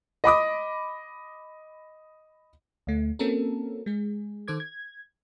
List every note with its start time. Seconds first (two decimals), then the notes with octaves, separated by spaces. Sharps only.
0.24 D#5 B5 D6 D#6
2.87 D2 A3
3.19 A#3 C4 C#4 F#4 A4 A#4
3.86 G#3 G#4
4.48 D#3 A4 C5 D6 G#6
4.60 G#6